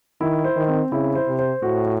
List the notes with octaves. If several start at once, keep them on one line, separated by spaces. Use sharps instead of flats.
D#3 E4
C5
D#3
C4
C#3 E4
C5
C3
C5
A2 F#4